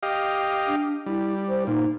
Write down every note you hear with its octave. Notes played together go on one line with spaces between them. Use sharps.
G4 D#5 F5
D4
G3 E4
C5
A#2 D#4